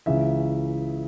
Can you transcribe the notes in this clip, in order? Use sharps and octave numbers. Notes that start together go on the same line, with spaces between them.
C#2 C#3 E3 E5